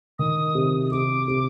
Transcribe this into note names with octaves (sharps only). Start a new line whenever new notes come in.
D#3 D#6
C3
C3 D6
C3